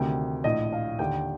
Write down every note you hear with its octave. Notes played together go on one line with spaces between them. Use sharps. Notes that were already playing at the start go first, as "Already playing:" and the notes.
Already playing: D2 C3 D#3 G5
A#1 A2 D#5
F5
D#2 D3 G5